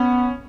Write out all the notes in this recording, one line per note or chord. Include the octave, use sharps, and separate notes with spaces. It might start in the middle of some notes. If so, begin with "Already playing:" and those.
Already playing: B3 C#4